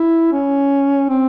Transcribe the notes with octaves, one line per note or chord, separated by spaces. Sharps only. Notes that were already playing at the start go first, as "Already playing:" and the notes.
Already playing: E4
C#4
C4